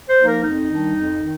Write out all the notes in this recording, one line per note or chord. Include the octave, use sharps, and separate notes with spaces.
C5
F3 A#3 D#4
A#4
F2 D#4
D#3 G3 D4
F2
D#3